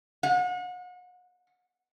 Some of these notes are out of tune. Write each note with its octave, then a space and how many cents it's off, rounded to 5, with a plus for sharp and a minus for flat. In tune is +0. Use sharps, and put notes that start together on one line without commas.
F#5 -40